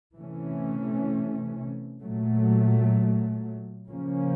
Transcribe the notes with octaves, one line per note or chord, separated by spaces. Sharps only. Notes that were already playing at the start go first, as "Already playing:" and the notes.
C3 E3 A3 C#4
A#2 F#3 A3
C#3 F3 A#3 C#4